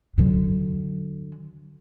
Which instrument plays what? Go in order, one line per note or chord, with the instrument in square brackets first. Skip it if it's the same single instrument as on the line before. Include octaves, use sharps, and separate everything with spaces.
[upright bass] D3 F#3